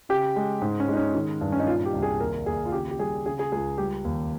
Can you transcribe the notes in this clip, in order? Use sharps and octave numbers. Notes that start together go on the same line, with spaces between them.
C#3 G4
G#3
G#2
C#4
G#3 D#4
C#4
D#3
G2
C#4
D#4
A#2 F4
G4
C2
G#4
D#2 A#4
D#2 G#4
F4
C#3 G4
G4
G3 G#4
C#3 G#4
G#4
C#2 G#4
G3 G4
D#2